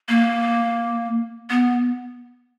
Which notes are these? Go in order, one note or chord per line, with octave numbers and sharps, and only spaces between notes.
A#3
B3